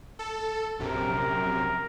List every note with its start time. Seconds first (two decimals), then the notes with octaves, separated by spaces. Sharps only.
0.19 A4
0.79 A#1 F#2 C3 A#4